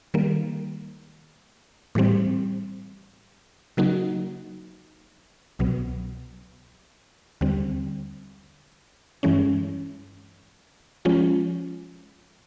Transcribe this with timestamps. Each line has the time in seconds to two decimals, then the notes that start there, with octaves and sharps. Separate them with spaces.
0.14 D#3 G3 A#3
1.95 A2 E3 G3 C4
3.77 C#3 F#3 A#3 D#4 F#4
5.59 C2 B2 F#3 B3
7.41 D#2 D3 G3 C4
9.23 G2 E3 G#3 C#4
11.05 F3 G#3 C#4 F4